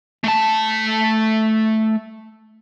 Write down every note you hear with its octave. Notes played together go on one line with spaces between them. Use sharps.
A3 A5